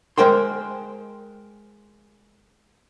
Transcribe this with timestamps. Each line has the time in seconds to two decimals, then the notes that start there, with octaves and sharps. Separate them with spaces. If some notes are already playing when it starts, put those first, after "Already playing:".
0.18 G#3 A#4 C5 G5 C6